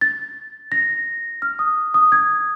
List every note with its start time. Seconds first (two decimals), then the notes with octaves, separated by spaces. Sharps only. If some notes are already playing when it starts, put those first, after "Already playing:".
0.01 A6
0.72 A#6
1.42 F6
1.59 D#6
1.94 D#6
2.12 G#6